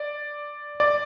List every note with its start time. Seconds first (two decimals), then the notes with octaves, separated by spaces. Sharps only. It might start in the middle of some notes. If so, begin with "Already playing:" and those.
Already playing: D5
0.80 D5